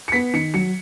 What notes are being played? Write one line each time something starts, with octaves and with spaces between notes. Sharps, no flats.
C#7
B3 B6
D#3 C#7
F#3 C#7